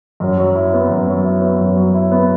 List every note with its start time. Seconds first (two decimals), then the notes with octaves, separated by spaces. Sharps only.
0.20 F#2
0.38 F#3
0.55 E4
0.73 B3
0.90 F#2
1.08 F#3
1.24 E4
1.42 B3
1.60 F#2
1.77 F#3
1.94 E4
2.12 B3